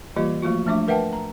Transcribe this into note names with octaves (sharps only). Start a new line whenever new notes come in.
E3 G3 A#3 F4 G4 D#5
F3 A3 A#3 F4 F#4
F3 A3 D4 E5 D6
A#4 B4 E5 F#5 G5 A5
A#5